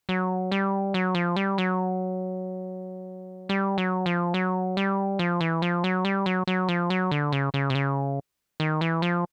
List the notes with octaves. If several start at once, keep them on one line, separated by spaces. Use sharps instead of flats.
F#3
G3
F#3
F3
G3
F#3
G3
F#3
F3
F#3
G3
F3
E3
F3
F#3
G3
F#3
F#3
F3
F#3
D3
C#3
C#3
C3
C#3
D#3
E3
F3